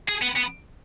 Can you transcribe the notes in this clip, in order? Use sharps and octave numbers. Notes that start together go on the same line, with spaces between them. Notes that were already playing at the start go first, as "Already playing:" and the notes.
G#4
B3
B3